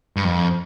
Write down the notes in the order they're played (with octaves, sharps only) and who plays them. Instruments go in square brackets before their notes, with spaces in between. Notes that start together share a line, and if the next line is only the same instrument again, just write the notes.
[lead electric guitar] G2
F2